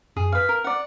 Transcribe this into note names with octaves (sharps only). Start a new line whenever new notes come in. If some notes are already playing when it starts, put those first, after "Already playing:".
F#2 G#4
B4 F5
A#4
D5 F#5